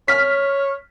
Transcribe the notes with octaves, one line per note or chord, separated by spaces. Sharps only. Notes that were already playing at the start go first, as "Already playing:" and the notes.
C#5 F6 B6